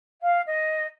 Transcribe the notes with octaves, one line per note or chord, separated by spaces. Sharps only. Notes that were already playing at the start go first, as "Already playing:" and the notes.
F5
D#5